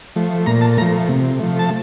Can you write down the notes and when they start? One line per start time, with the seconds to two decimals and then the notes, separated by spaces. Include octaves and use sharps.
0.16 F3 A3
0.46 A#2 A#5
0.61 A5
0.78 A3 A#5
0.82 F3
1.09 C3
1.39 F3 A3
1.59 A5